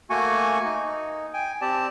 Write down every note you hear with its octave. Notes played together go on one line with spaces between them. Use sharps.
A3 A#3 F#4 G#5 C#6
D#4
G5 G#5
C4 G4 D5 A5